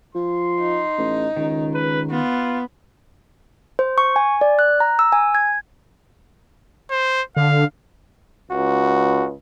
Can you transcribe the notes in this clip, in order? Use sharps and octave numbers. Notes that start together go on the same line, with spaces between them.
F3 C6
D#4
A1
C#2 D#3
B4
B3 F4
C5
C#6
G#5
D5
F#6
A#5
E6
G#5
G#6
C5
D3 F5
C#2 F#4